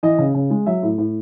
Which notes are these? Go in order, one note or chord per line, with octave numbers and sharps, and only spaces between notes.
E3 D#5
C#3
C#3
G#3
F#3 E5
A2
A2